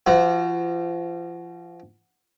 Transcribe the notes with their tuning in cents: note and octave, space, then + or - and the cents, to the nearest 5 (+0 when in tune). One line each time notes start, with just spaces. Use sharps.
F3 -30 F#4 +0